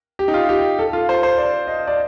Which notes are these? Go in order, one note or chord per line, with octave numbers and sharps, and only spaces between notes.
G4
D#4
F4
G4
A4
F4
C5
C5
D5
D#5
D5